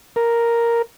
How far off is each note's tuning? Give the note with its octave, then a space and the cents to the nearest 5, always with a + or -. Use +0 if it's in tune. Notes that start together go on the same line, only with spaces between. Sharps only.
A#4 +0